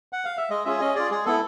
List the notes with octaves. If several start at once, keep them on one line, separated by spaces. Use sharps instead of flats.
F#5
F5
E5
G#3 D#5
C#4 F4 G#4 E5
C#4 D#5
F4 G#4 D5
G#3 G#4
B3 E4 A4